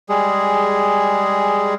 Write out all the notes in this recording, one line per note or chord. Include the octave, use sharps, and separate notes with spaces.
G3 G#3 G#4